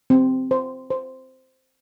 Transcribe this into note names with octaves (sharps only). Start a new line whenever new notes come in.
C4
C5
C5